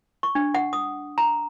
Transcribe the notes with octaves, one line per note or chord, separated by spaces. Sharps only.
C#6
D4
F#5
D#6
A#5